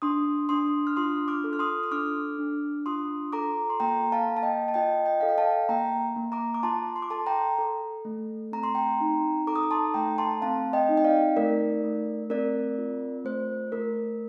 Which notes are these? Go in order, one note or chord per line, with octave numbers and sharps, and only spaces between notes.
D4 C6 D#6
D4 C6 D#6
F6
F4 C6 D#6
D6 F6
A4
F6
C6 D#6
D#6
D4 D6 F6
D4
F4 C6 D#6
A4 A#5 D6
C6
A#3 G5 A#5
F5 A5
A#3
A5
D#5 G5
A5
F4 D#5 G5
D#5 G5
A4 F5
G5
F5 A5
A#3 G5 A#5
A#3
A#5 D6
D6
F4 A5 C6
C6
D6
A4 A5 C6
G5 A#5
A4
A3
C4 A#5
C6
G5 A#5
D#4
A4 A#5 D6
D#6
D6
A5 C6
A3 G5 A#5
A5 C6
C4 F5 A5
D#5 G5
D#4
G5
D5 F5
A3 A#4 D5
A3
C4 A#4 D5
F4
A3 C5
A3 A#4